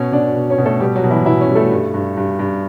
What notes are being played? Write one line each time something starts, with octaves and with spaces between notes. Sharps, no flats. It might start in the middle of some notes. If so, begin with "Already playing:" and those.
Already playing: B2 C#4 C#5
B2 D4 D5
B2
C#4 C#5
B2
A3 A4
B2 G3 G4
F#3 F#4
B2
E3 E4
B2 E3 E4
C#4
G3
A3 A4
G2
G2
G2
G2